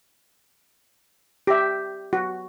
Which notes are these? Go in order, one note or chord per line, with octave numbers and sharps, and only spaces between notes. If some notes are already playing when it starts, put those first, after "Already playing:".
G4 E5
F#4